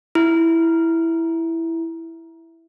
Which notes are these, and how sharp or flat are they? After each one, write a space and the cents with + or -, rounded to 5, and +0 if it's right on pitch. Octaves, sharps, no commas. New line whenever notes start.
E4 +0